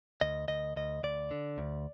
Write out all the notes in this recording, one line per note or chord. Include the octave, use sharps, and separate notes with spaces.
D2 D#5
D2 D#5
D2 D#5
D2 D5
D3
D2